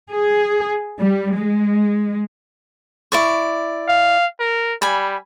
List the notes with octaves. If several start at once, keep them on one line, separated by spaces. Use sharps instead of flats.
G#4
G3
G#3
E4 D5 C#6
F5
A#4
G3 G#5 B5